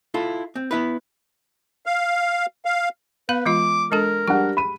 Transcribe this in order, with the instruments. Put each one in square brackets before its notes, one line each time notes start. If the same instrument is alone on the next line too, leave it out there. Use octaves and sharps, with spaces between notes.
[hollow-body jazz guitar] E4 F4 A4
C4
B3 E4 B4
[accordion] F5
F5
[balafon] B3 F5 B5 [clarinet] B4
[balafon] E3 G#3 F4 [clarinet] D6
[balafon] G#3 D4 A4 [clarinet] A#4
[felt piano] G3 D4 F#5 [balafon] G4
[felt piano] B5 D#7